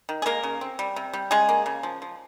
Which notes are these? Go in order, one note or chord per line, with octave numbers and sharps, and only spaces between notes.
D#3
G#4
G#3 A#3 A#4
C#3
C4
G3
C3
G3
C#3 G#3 G#4
A#3
C#3
F3
F3